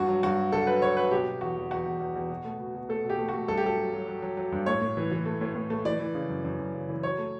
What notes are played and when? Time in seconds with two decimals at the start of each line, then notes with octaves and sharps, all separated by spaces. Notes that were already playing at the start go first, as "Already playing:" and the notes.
Already playing: G2 F#4
0.08 F#3
0.23 G2 F#4
0.38 F#3
0.52 D3 A4
0.67 F#3 B4
0.82 D3 C#5
0.97 F#3 B4
1.11 B2 G4
1.27 B2
1.41 E2 F#4
1.56 E2
1.71 E2 F#4
1.86 E2
2.00 E2
2.15 E2
2.30 B2
2.45 A3
2.60 B2
2.75 B2
2.89 A3 A4
3.05 B2 G4
3.19 A3
3.29 F#4
3.34 A3
3.48 G2 A4
3.58 G4
3.63 F#3 A4
3.78 F#3
3.93 F#3
4.08 F#3
4.22 F#3
4.37 F#3
4.52 G2
4.66 A2 C#5
4.81 A2
4.97 E3
5.11 E3
5.26 A3
5.41 A2
5.55 A2
5.70 A3
5.85 E3 D5
6.00 E3
6.14 C#3
6.29 F#2
6.44 F#2
6.59 F#2
6.74 C#3
6.89 E3
7.03 F#3 C#5
7.18 A3